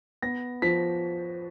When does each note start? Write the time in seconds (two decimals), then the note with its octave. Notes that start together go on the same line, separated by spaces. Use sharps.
0.22 B3 A#6
0.62 F3 B6